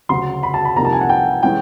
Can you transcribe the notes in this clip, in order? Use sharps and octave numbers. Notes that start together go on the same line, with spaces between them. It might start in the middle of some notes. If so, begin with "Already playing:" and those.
D2 C#3 F#3 C6
B5
A5
B5
C2 C3 F3 A#3 D#4 A#5
A5
G#5
F#5
G5
E3 G#3 C#4 G5